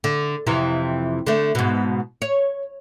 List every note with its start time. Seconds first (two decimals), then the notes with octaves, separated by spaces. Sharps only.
0.04 D3
0.47 F2 C3 E3
1.27 D3 A3
1.55 G#2 B2
2.22 C#5